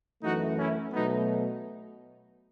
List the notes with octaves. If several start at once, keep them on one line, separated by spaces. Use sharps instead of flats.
F#2 E3 A3 D#4 F#4
C#4 E4
B2 F#3 A3 B3 D#4